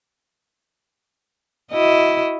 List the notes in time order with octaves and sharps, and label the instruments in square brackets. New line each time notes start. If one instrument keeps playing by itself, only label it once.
[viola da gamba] E4 F#4 D#5